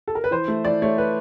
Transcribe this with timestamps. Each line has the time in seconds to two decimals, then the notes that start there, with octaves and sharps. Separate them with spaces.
0.08 A4
0.15 A#4
0.24 B4
0.31 E3 C5
0.48 A3
0.65 E3 D5
0.82 A3 C#5
0.98 B4